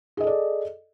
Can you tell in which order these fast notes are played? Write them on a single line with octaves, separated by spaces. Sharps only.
G#4 D#5 A4 D5